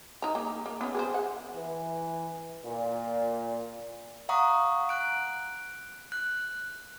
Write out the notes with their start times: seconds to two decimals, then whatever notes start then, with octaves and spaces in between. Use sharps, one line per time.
0.22 D#4 A#5
0.35 A#3
0.66 A#3
0.81 B3 C#4
0.95 G#4 A#4 C5
1.14 F#5
1.54 E3
2.66 A#2
4.29 F5 F#5 A#5 C#6 D#6
4.89 F#6 D7
6.12 F#6